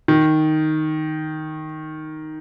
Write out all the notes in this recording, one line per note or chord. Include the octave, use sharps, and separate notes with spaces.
D#3